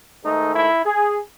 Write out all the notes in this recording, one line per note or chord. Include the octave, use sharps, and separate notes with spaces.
G#2 D#3 A3 D#4
E4
G#4